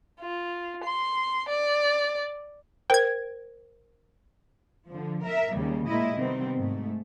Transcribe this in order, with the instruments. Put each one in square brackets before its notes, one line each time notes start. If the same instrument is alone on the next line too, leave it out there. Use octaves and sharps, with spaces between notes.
[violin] F4
C6
D5
[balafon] A#4 C5 [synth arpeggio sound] G5 G#6
[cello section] D3 F3
A#4 E5
D#2 C#3 G3
A#2 G#3 E4 D#5
C3 D#3 G3 B3 C4
G#2 A3